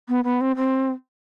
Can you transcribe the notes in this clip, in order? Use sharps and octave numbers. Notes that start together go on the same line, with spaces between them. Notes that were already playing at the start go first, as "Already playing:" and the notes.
B3
B3
C4
C4